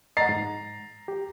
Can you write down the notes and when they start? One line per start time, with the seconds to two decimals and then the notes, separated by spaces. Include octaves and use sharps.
0.17 D#5 F#5 A#5 A6 C7
0.29 G#2
1.08 G4